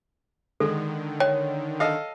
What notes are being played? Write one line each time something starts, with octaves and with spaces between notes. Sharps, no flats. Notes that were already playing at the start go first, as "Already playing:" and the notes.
D3 D#3 G#3 A4
C#5 G5
A4 D#5 F5